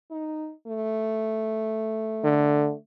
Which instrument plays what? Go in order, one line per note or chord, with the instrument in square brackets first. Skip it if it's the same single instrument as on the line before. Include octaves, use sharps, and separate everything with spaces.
[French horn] D#4
A3
[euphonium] D3